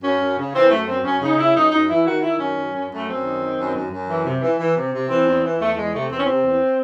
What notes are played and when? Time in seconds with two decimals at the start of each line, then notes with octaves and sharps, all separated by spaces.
0.02 F#2 C#4
0.20 F#2
0.37 C#3
0.53 E3 C4
0.70 F#2 A3
0.86 F#2 C4
1.03 F#2 C#4
1.20 C#3 D#4
1.37 C#3 E4
1.55 F#2 D#4
1.71 F#2 D#4
1.88 E3 E4
2.05 D#3 F#4
2.22 D#3 E4
2.38 F#2 C#4
2.56 F#2
2.72 F#2
2.89 F#2
2.94 A3
3.07 F#2 C4
3.23 D#3
3.40 D#3
3.57 F#2
3.74 F#2
3.90 F#2
4.07 E3
4.24 C3
4.41 E3
4.58 E3
4.76 C3
4.92 C3
5.08 E3 C4
5.25 E2
5.43 E3
5.59 E2 A3
5.76 E2 G#3
5.93 C3 A3
6.10 E2 C4
6.18 C#4
6.24 C3 C4
6.43 E2